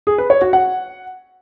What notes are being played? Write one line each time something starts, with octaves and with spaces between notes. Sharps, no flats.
G#4
B4
C#5
F#4
F#5